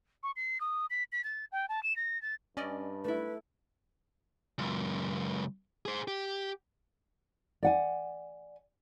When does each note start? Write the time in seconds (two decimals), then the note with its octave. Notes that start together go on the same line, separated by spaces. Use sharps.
0.23 C#6
0.36 C7
0.61 D#6
0.90 B6
1.12 B6
1.24 A6
1.52 G5
1.69 A5
1.83 E7
1.96 A#6
2.22 A6
2.57 G2 C#4 D5 D#5
3.04 A3 E4 B4
4.58 C#2 F#2
5.85 G#4 C5
6.08 G4
7.63 D5 F#5 G#5